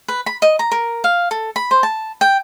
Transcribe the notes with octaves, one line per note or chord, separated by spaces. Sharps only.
B4
B5
D#5
A#5
A#4
F5
A4
B5
C5
A5
G5